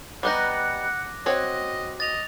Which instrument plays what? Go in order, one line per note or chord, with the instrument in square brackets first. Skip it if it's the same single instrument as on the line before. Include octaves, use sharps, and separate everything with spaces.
[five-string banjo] G3 B3 D#4 [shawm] F#5 [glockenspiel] D6 F#6 A#6
[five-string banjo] C4 F#4 C#5 [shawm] D#5
[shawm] D#5 [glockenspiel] A6 F7